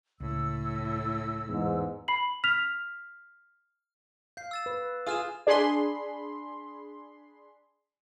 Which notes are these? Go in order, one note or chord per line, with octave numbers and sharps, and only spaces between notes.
C#2 A2 E6
E2 G#2
B5 C7 F#7
F6 B6 F7
F5 G6 C7
E6 A6 E7
B4
F4 G#4 D#6 F6 E7
D4 G#4 B5 C6